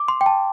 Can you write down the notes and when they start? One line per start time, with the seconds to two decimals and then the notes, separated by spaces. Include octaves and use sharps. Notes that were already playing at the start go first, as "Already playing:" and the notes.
Already playing: D6
0.08 C6
0.21 G5
0.26 A5